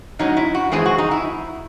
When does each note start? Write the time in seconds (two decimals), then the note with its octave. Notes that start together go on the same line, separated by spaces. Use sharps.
0.19 G#2 F#3 C#4 D#4
0.37 E4
0.55 F#4
0.72 F#2 E3 G#3 C4 G#4
0.86 F#4
0.98 D#4
1.11 E4